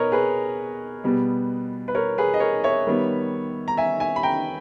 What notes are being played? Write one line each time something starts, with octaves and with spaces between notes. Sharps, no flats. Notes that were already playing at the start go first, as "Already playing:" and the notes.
Already playing: B2 A#4 B4 C#5 D#5
G#4 B4
B2 G3 B3
B4
A#4 C#5
G#4 B4
D#5
A#4 C#5
C#5 E5
D#3 G3 B3
A#5
E5 G#5
E5 G#5
B5
G5 A#5